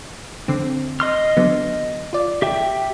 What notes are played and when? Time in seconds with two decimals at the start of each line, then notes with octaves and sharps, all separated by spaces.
0.48 D3 C4
1.00 D#5 C6 F6
1.37 D3 F#3 B3
2.13 F4 D5
2.42 G4 E5 G5